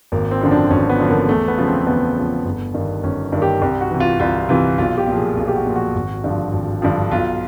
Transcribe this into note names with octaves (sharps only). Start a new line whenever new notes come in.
G#1 A#3
C4
F#2 D3 F3
D4
G#1 C#4
B3
F#2 D3 F3
A#3
E2 A3
B3
C#3 F3
C4
E2 B3
C#3 F3
G1
G2 D#3
G1 C#4
G2 D#3
G4
C2 G4
F#4
C3 E3
F4
C2 F4
C3 E3 F4
B1 F4
G4
A#2 F3
G#4
B1 G#4
G4
F#4
A#2 F3
F#4
G#1
G2 D3 F3
G#1
G2 D3 F3
B1 F4